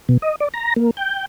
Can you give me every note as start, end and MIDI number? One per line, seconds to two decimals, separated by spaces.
0.09 0.18 47
0.22 0.35 75
0.40 0.48 74
0.54 0.74 82
0.76 0.91 58
0.97 1.26 79